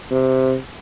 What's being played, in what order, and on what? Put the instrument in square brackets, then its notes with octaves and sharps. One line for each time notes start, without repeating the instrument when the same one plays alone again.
[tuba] C3